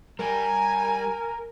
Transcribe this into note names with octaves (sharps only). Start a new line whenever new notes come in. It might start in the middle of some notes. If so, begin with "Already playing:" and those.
G3 G4 A#4 G#5 A#5